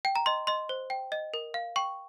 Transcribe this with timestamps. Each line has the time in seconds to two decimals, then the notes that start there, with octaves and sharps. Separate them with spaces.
0.05 G5
0.16 A#5
0.26 D#5 C6
0.47 D#5 C6
0.69 C5
0.90 G5
1.12 D#5
1.34 A#4
1.54 F5
1.76 G5 C#6